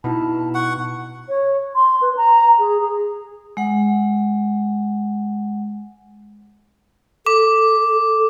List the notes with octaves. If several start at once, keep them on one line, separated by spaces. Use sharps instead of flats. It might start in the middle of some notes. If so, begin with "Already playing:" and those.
B2 D#4 E4 A5 B5
F#5 C#6
C#5
C6
B4
A#5
G#4
G#4
G#3 F#5
A4 D6